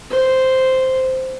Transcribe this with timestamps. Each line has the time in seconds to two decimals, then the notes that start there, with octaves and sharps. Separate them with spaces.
0.10 C5